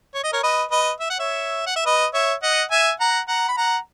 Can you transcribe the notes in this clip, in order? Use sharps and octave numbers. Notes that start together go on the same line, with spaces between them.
C#5
D#5
A#4 C#5
B4 D#5
B4 D#5
E5
F#5
C#5 E5
F#5
E5
B4 D#5
C#5 E5
D#5 F#5
E5 G#5
F#5 A#5
F#5 A#5
B5
F#5 A#5